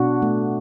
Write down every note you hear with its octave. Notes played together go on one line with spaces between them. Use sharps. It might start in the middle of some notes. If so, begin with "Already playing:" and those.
Already playing: B2 D4 F#4
A3